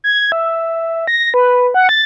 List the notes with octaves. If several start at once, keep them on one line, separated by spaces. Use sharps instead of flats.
G#6
E5
A#6
B4
F#5
A6